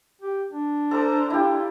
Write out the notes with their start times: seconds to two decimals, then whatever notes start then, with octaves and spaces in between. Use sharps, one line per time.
0.21 G4
0.52 D4
0.91 A4 A#4 C5 D5 A#5
1.30 E4 F4 G4